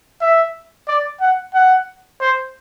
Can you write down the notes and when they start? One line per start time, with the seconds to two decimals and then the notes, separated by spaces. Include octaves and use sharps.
0.22 E5
0.88 D5
1.21 F#5
1.54 F#5
2.21 C5